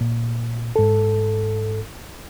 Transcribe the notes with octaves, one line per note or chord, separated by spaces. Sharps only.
A#2
G#2 A4